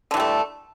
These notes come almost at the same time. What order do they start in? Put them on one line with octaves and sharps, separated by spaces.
D3 E3 G3 A3